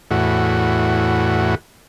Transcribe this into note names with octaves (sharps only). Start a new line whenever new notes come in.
E2 A2 F#4